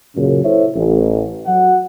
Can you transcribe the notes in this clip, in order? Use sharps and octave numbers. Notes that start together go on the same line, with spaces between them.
F#2 A#2 C#3
E4 A4 C5 C#5 E5
A1
F#3 F#5